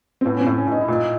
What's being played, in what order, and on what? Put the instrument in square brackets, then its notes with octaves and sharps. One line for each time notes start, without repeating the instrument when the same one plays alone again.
[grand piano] C4
[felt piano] A2 [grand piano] B3
[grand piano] C#4
C4
[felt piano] A2
[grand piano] C#4
[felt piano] A2
[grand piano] D#4
E4
[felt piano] A#2 [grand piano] D#4